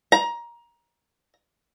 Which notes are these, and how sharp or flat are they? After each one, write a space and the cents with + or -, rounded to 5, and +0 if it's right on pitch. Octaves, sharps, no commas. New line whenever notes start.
A#5 +20